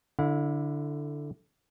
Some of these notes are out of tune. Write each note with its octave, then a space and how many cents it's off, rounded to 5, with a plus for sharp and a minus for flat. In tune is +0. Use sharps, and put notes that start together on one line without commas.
D3 +0 E4 +0 F#5 -45